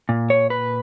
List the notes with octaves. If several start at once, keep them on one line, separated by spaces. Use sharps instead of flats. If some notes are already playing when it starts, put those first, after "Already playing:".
A#2
C#5
B4